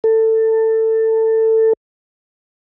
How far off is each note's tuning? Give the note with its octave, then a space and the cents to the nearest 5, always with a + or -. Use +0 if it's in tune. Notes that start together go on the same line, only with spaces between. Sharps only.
A4 +20